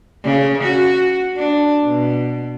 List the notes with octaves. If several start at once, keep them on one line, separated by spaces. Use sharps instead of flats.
C#3
F#4
D4
B2